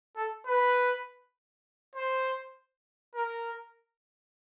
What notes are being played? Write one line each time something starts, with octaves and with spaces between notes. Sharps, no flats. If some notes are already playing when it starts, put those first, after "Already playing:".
A4
B4
C5
A#4